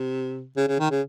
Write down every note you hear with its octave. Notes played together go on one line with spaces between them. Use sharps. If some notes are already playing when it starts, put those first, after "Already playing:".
Already playing: C3
C#3
C#3
D#3
C#3